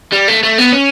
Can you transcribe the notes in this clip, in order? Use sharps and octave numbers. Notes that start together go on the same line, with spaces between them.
G3
A3
A3
B3
C#4